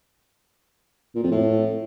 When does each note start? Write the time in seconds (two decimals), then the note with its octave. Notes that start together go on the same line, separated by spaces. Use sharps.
1.15 A#2
1.23 F2
1.31 A2